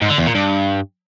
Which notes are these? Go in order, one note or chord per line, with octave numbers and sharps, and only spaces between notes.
G#2
D3
E2
A#2
G2